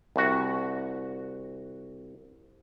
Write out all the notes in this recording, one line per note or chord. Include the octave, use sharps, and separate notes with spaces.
C2 F#4